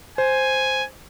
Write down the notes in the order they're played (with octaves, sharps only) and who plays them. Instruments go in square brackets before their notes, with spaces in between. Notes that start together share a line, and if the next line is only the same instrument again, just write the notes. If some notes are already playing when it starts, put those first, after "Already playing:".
[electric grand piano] C5 [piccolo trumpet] G#5